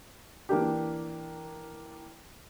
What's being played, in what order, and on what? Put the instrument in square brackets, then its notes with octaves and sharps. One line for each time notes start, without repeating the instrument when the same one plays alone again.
[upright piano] E3 A#3 D4 G4